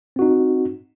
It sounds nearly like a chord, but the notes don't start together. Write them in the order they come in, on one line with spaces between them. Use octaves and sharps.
C4 F#4 D#4